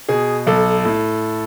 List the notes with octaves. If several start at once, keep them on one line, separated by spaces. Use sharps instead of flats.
B2 G#4
B1 A4
A2